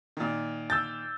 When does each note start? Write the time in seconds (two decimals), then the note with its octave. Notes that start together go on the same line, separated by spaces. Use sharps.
0.17 A#2 D#3
0.70 E6 G6 A6